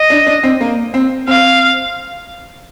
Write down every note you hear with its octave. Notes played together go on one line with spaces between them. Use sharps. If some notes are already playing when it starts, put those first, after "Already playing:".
Already playing: D#5
D4
D4
C4
A#3
C4
C4 F5